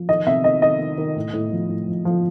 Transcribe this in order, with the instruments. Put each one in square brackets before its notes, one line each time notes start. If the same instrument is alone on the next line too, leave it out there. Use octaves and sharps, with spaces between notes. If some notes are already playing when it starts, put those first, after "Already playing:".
Already playing: [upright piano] F3
D#3 D#5
C3 E5
D#3 D#5
D#3 D#5
D#3
D#3
A2
A2
F3
A2
F3
F3